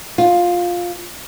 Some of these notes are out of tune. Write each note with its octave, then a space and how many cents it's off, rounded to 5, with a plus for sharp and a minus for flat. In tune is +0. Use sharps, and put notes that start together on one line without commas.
F4 +10